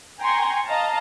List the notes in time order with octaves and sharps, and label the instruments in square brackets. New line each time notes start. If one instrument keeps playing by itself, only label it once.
[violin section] G5 G#5 A#5 C6 C#6
D#5 F5 A5 A#5